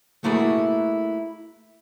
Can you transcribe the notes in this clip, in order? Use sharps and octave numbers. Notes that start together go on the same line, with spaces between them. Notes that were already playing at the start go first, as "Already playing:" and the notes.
A3 A#3 E4 F#4 G#4